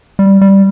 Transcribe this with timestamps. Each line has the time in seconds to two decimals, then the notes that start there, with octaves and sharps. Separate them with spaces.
0.19 G3
0.41 G3